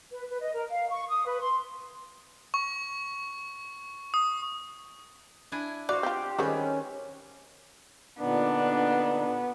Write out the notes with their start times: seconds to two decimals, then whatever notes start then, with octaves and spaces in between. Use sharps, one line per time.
0.11 B4
0.28 B4
0.41 D#5
0.54 A#4
0.69 F5
0.90 C#6
1.08 D#6
1.26 B4
1.39 C6
2.54 C#6
4.14 D#6
5.52 D4 E4 G#5
5.89 F#4 C5 D5 F5 D6
6.03 C4 F4 G4
6.39 D#3 G3 G#3 C4 C#4 B4
8.20 A#2 D3 B3 D4 D#4